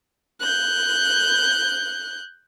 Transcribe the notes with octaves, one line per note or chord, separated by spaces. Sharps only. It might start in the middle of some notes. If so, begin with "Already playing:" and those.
F#6 G6